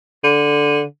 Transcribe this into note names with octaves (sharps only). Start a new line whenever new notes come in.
D3